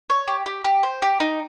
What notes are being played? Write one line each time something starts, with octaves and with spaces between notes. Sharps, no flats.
C#5
G4
G4
G4
C5
G4
D#4